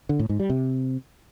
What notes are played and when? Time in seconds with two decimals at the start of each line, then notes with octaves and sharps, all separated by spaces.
0.09 D3
0.19 A2
0.29 G#2
0.40 G3
0.50 C3